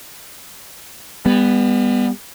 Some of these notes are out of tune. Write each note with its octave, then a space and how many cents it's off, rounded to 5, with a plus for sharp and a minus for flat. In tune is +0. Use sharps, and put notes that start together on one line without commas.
G3 +40 B3 +0